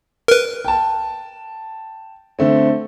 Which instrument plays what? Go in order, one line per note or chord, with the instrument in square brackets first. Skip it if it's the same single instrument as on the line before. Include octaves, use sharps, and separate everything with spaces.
[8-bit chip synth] A#4 B4
[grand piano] G5 A5
D3 A3 C4